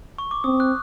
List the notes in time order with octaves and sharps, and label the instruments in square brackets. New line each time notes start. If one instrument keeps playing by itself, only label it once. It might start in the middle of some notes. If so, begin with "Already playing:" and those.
[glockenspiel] C#6
D6
[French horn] C4 [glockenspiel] D#6
[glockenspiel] F#6